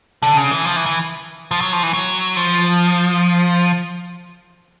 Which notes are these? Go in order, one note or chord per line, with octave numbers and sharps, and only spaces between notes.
D3
C#3
E3
F3
E3
E3
F3
F#3
F3
E3
F#3
F3